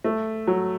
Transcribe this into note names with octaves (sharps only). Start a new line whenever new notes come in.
A3
F#3